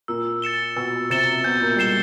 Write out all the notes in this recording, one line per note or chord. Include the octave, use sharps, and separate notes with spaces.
A#2 A#3 E6
A6 C#7 E7 G7
B2 B3 E6
C3 C4 A6 C#7 E7 G7
B2 B3 G6
A#2 A#3
G3
G#3 C7 E7 G7